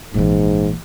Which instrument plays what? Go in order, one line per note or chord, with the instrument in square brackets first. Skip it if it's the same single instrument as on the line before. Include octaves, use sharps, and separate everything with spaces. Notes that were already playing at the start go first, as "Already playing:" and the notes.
[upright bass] A#1 E3 [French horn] G#2